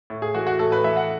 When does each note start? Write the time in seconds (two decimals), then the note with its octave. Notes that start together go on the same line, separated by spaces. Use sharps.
0.10 A2
0.22 G#4
0.34 E3 A3 F#4
0.47 F#4
0.59 A2 A4
0.72 B4
0.84 E3 A3 E5
0.97 F#5